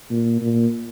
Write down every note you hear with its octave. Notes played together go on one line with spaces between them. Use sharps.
A#2
A#2